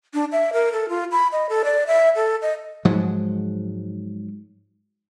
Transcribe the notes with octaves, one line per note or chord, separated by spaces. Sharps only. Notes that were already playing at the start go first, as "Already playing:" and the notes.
D4
E5
A#4
A4
F4
B5
D#5
A4
D5
E5
A4
D#5
G#2 F3 F#3 G#3